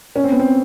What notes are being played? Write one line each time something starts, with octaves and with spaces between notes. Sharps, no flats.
C#4
C4
B3
C4